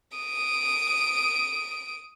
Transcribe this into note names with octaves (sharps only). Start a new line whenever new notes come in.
D#6 D7